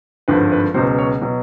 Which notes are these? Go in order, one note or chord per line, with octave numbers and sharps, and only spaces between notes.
G#1 G2 D3 F3 B4
B4
C#2 B2 F#3 C5
C#5
B2 F#3